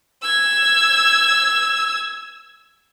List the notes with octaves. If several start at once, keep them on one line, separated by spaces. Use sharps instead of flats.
E6 G#6